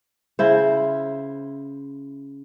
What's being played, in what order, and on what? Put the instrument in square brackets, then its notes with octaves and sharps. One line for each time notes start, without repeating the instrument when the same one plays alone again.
[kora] C#3 E4 C5